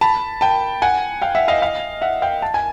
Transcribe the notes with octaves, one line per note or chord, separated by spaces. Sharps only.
A5 B5
G5 A5
F#5 G#5
F5 G5
E5 F#5
D#5 F5
D#5 F5
E5 F#5
F5 G5
A5
G#5